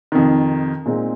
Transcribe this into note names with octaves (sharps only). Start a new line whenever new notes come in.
F2 C3 D#3
A#2 G#3 C4 D#4